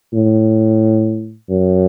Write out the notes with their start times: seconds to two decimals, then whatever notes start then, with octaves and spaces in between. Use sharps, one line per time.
0.14 A2
1.50 F#2